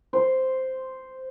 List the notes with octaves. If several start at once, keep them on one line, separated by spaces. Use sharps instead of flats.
C5